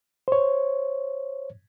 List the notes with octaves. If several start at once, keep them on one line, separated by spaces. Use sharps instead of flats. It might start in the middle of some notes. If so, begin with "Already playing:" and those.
C5 C#5